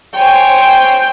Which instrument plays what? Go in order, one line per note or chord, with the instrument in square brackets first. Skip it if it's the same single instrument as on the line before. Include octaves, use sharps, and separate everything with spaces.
[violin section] C5 C#5 G#5 [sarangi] G5